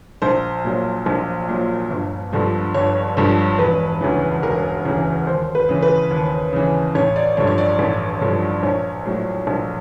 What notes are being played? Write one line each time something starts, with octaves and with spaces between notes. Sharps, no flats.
A#1 C5
A#2 F#3
A#1
A#2 F#3
G1
G2 D3 F3
G1 C#5
G2 D3 F3
E1 B4
D2 C#3 E3
E1 A#4
D2 C#3 E3
D#2 C5
B4
C#3 E3
B4
D#2
C#3 E3
A1 C#5
D5
G2 D3 F3 C#5
C#5
D5
A1
G2 D3 F3
A#1 C#5
A2 F#3
A#1